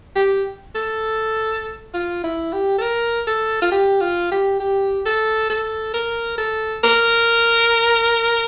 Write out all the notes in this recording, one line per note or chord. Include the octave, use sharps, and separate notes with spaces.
G4
A4
F4
E4
G4
A4
A#4
A4
F4
G4
F4
G4
G4
A4
A4
A#4
A4
A#4